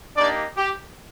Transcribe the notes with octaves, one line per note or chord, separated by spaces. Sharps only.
A#3 D4 D#4 G4 D5
G4